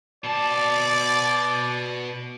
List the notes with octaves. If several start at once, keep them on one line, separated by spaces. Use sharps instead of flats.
B2 D5 A5